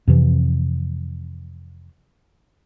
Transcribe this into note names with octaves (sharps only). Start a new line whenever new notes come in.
F2 C3 E3 F3